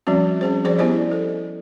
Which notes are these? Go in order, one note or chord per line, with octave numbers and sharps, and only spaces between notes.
F3 G3 C4 C#4 F#4
C#4 G#4 C5
F3 G#4 C5 D5
B3 E4 G4 C5 D5 D#5
A4